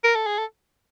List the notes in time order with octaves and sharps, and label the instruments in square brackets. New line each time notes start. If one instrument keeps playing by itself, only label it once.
[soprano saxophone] A#4
A4
G#4
A4